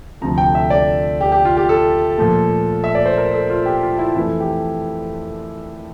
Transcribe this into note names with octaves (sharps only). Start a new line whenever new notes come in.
D2 C3 F3 A3 A#5
G5
E5
D5
G4
G4
F4
G4
A4
A#2 F3 A3
E5
D5
C5
A#4
A4
F4
G4
F4
E4
F2 E3 A3 E4
G4